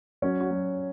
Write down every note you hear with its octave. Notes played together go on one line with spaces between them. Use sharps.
F#3 C#4
F#4
F#3